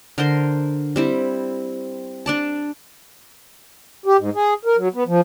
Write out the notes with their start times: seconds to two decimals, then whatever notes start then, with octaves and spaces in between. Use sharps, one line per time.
0.18 D3 A#4 C5 C6
0.96 G3 C4 E4
2.26 D4 D5 A5
4.06 G4
4.19 G#2
4.35 G#4
4.65 A#4
4.77 F#3
4.94 B3
5.07 F3